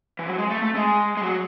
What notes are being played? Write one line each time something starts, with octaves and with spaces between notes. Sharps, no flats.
E3
F#3
G#3
A3
A3
G#3
G#3
F#3